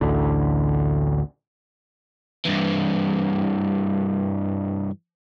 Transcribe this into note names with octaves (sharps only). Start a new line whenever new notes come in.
A1 D2 D3
G2 E3